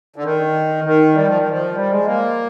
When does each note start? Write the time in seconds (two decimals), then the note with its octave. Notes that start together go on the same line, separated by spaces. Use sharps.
0.16 D3
0.23 D#3
0.84 D#3
1.15 G3
1.26 F3
1.37 D#3
1.49 F3
1.75 G3
1.90 G#3
2.05 A#3